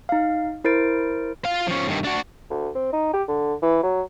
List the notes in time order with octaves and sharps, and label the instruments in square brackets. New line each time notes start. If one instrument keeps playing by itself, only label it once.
[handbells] D#4 F5
E4 A#4 C5 A6 D7
[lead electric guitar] F4 F5
F3 C#4
G2 D#3
D4 F#4
[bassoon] D2
C4
D#4
G4
D3
E3
F#3